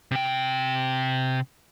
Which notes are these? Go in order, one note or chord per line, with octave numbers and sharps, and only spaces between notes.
C3 G5